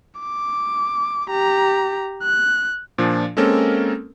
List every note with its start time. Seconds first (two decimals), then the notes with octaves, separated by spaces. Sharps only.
0.21 D6
1.30 G4 A#5
2.23 F#6
2.98 A#2 F3 D4
3.37 G#3 A#3 C4 C#4 A4 A#4